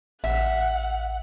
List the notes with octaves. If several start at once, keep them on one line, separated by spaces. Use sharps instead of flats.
A1 E5 F#5